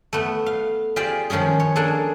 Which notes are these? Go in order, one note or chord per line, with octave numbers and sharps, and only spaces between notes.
A3 B3
F5
F4 G4 G#4 C5 D5
D#3 F3 G#3 C#4 G#4
C#5
A#3 D4 G#4 A4